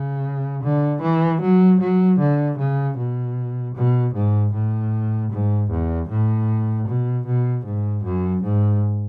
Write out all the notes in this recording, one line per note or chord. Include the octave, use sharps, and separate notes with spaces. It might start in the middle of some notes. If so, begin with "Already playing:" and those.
Already playing: C#3
D3
E3
F#3
F#3
D3
C#3
B2
B2
G#2
A2
G#2
E2
A2
B2
B2
G#2
F#2
G#2